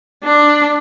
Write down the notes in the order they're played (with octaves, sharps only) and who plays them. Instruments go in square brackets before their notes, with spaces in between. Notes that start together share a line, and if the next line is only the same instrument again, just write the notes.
[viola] D4